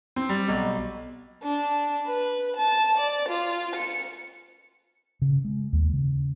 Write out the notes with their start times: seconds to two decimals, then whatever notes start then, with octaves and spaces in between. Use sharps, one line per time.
0.16 C4
0.29 G3
0.48 B1
1.43 D4
2.07 B4
2.57 A5
2.98 D5
3.29 F4
3.76 C#7
5.22 C#3
5.44 G#3
5.73 D#2
5.93 C#3